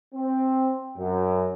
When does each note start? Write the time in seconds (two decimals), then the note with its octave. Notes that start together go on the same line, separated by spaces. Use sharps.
0.14 C4
0.97 F#2